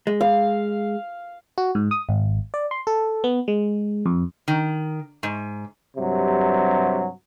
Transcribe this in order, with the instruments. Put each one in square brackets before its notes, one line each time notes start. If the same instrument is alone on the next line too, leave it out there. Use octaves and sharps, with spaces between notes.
[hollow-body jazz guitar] G#3
[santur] F5
[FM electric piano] F#4
G#2
D#6
G#1
D5
C6
A4
B3
G#3
F2
[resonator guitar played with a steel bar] D#3
G#2
[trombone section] G2 C3 F#3